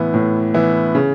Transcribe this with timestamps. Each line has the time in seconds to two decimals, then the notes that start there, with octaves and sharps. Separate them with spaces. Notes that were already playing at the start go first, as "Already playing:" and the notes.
Already playing: A2 E3 B3 E4
0.14 A2
0.54 E3 B3 E4
0.95 C#3